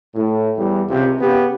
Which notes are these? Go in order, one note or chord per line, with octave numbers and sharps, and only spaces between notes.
A2
E2 G3
C#2 C3
C#3 B3 G4